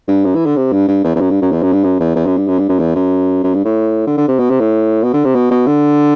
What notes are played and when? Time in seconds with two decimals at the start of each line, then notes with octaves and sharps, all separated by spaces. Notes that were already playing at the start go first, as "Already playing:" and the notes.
0.08 G2
0.25 F#2
0.35 E3
0.46 D3
0.56 C3
0.72 G2
0.88 G2
1.04 E2
1.15 E2
1.20 F#2
1.30 G2
1.42 F#2
1.52 E2
1.62 F#2
1.73 G2
1.84 F#2
2.00 E2
2.16 E2
2.26 F#2
2.37 G2
2.48 F#2
2.59 G2
2.69 F#2
2.79 E2
2.96 F#2
3.44 F#2
3.54 G2
3.65 A2
4.07 D3
4.18 D3
4.28 C3
4.39 B2
4.50 C3
4.60 A2
5.03 B2
5.14 D3
5.25 C3
5.35 B2
5.51 B2
5.67 D3